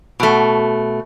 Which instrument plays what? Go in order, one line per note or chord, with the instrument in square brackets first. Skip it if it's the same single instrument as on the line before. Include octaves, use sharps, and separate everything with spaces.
[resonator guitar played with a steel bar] B2 A3